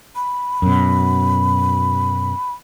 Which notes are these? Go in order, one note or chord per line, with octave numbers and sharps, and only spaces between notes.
B5
F#2 B2